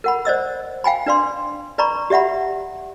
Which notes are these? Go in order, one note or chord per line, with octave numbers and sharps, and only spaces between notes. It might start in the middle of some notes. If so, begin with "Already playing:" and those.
A#4 F#5 B5
C5 D5 D#5 E6
F5 G5 G#5 B5
D4 B4 D5 F5 C6
B4 D5 A#5 B5 C#6
G4 D5 E5 F#5 B5